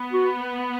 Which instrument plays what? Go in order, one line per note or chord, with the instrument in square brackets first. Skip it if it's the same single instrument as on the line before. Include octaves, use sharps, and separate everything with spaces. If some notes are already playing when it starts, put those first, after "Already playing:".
Already playing: [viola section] B3
[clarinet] F#4